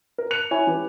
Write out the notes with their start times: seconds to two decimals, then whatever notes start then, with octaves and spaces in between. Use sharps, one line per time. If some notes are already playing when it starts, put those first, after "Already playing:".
0.18 A#4
0.31 F#6 C#7 F7
0.51 E4 C#5 G#5
0.67 E3 G4 B4